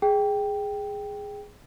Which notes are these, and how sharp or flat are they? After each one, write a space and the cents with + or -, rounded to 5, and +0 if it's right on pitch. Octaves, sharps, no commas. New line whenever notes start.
G#4 +0 G5 +0